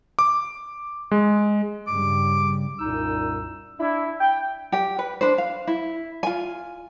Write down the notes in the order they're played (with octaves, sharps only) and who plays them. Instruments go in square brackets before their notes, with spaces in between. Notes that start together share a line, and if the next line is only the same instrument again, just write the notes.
[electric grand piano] D6
G#3
[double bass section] G2 C#3 G3 [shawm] D6
[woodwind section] C2 F#2 A#2 D#4 E6
[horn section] D4 E4
G5
[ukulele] G4 G5
B4
D4 B4 C5
F5
E4
F4 G#5